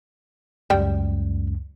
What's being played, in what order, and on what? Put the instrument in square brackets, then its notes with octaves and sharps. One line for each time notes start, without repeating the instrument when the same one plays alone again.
[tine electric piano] C#2 F#2 [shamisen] G3 G5